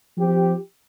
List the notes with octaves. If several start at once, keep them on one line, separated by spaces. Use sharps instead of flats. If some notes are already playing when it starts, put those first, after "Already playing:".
F3 C4 G4